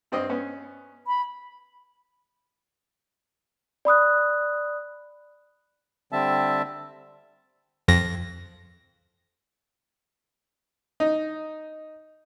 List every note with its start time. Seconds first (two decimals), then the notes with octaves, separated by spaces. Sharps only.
0.12 G2 C4 D#5
0.29 B3 C#4
1.07 B5
3.85 D5 B5 D#6 F#6
6.12 D3 G3 C4 E5 A5
7.88 F2 A#6
11.00 D#4